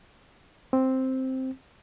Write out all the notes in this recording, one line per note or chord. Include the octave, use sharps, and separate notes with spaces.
C4